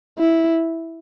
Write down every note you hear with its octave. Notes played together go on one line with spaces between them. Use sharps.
E4